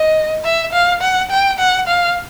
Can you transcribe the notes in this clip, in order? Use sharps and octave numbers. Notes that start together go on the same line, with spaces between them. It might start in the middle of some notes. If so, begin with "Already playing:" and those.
Already playing: D#5
E5
F5
F#5
G5
F#5
F5